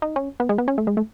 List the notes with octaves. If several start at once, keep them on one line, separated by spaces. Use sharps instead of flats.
D#4
C#4
B3
G#3
B3
C#4
A3
G#3
A3